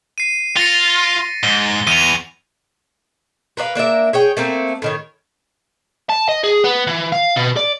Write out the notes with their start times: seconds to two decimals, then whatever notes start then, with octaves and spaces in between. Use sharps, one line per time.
0.18 C7 D#7
0.57 F4 A6 A#6 C#7
1.43 G#2 G7
1.87 E2 D#7 F7
3.57 A#4 B4 D5 F5
3.75 A#3 D4 A#4 E5
4.13 G#4 C#5 G5
4.37 A3 A#3 C4
4.82 A2 D#3 C#5
6.10 A5
6.29 D#5
6.43 G#4
6.64 B3
6.87 E3
7.12 F5
7.37 B2
7.57 D5